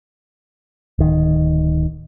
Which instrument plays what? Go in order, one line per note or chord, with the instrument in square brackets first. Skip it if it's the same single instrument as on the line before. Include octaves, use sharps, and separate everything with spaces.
[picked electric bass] D1 D#3